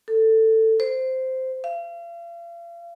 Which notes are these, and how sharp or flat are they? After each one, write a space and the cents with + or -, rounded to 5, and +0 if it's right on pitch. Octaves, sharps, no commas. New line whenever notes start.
A4 +15
C5 -5
F5 -40